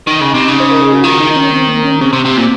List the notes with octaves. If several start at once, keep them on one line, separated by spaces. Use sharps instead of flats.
D#3 D#4
C#3
C3
C#3
C5
A#4
G#4
F#4
D#3 F4
D#4
D#4
C#4
C4
A#3
C#4
C#3 C4
C3
C3
A#2